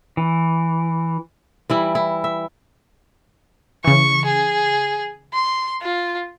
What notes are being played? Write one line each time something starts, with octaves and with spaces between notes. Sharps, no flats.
E3
E3 G3 E4
E4
E5
C#3 E3 C#6
G#4
C6
F4